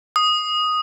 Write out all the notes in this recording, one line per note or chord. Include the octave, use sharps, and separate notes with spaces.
D#6